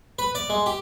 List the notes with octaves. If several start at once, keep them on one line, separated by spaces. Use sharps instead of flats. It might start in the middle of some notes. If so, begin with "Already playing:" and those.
B4
D5
G#3
G4